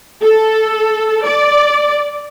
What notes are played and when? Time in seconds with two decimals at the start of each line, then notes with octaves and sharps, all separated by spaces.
0.22 A4
1.24 D5